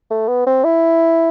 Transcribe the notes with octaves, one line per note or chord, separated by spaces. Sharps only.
A3
B3
C4
E4